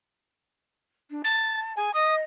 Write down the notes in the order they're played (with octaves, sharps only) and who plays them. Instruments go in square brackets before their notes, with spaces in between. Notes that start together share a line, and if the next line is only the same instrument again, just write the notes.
[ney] D4
[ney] A5 [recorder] A6
[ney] G#4 [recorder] G#5
[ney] D#5 [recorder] D#6